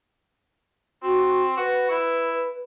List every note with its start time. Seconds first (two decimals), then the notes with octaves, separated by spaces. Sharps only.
1.03 C4 F#4
1.57 F#4 B4
1.90 E4